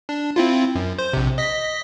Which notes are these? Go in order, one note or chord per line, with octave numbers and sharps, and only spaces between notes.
D4
C4 E4 F4
F#2
C5
A#1 C3
D#5 B6